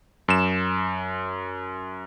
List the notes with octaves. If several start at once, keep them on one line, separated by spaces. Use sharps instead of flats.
F#2 E7